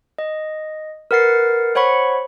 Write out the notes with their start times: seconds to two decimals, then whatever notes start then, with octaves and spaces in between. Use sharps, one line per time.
0.18 D#5
1.11 A#4 B4 F#5 A6 C7
1.75 C5 C#5 F#5 B5 C#6